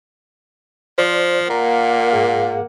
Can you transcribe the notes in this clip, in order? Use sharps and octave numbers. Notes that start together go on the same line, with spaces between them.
F3 C5 D5
A#2 A#3 F#5 A#5
G#2 G#4 F5